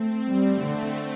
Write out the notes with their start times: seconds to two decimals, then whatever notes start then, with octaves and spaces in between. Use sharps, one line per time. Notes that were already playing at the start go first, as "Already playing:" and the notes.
Already playing: A3 C4
0.32 G3 A3
0.62 D3